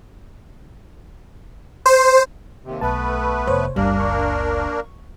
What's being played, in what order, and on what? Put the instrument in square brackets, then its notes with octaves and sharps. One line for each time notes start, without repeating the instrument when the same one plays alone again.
[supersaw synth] C5
[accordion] D#2 C3
[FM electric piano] B1 A5 [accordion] A3 B3 B4
[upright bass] F1 [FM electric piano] C5 C#5
[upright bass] F#1 C#2 [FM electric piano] G3 [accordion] A#3 D4 A#4
[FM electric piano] C#6